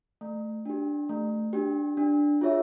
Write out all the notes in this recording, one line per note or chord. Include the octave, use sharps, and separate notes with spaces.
A3
D4 G4
A3
D4 G4
D4
F4 G#4 C#5 E5